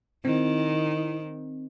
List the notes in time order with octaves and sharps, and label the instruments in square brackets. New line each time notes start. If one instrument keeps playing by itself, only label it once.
[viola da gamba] D#3 [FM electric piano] C4 [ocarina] E4